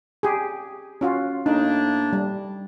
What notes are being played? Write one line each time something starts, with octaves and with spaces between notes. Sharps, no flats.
G4 G#4
C#4 F4 F#4
A2 A#3 D4 D#4
G3